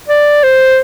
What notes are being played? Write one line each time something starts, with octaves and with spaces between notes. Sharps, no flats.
D5
C5